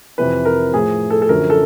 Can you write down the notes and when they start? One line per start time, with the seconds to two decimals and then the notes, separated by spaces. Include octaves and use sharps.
0.18 F2 C3 E3 B4
0.45 A#4
0.73 A2 F3 G#4
1.10 A4
1.22 A4
1.29 F#2 D3 F3 A#4
1.50 A4